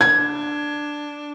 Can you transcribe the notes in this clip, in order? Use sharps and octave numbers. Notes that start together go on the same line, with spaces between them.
D4 G#6